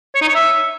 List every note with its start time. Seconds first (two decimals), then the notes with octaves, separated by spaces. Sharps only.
0.15 C#5
0.22 D#4
0.28 C#5
0.35 E5